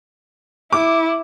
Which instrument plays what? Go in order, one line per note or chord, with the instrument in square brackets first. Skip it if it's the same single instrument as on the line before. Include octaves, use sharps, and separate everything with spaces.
[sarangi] E4 [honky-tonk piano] D6